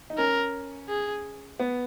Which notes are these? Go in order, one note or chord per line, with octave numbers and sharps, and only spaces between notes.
D#4
C#4 A#4
G#4
B3